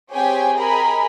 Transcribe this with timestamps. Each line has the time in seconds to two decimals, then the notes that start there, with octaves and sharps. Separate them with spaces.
0.12 C4 G4 G#4 C#5 G5 G#5
0.57 G#4 A#4 D#5 G#5 B5